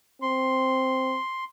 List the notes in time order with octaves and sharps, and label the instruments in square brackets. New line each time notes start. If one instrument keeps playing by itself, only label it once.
[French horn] C4 [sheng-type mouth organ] C6